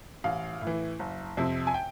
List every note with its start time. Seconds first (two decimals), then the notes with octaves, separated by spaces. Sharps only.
0.24 A1 F5
0.61 A2
0.67 E3
0.99 F#1
1.37 F2 C3
1.67 G#5
1.74 G5